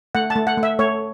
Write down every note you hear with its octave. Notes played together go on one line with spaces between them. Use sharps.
A3 F#5
A5
A3
F#5
A3
E5
A3 C#5